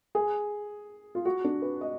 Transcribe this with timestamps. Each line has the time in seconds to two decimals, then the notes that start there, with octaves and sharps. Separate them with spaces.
0.15 G#4
1.15 F4
1.25 F#4
1.44 D4
1.62 B4
1.81 D#5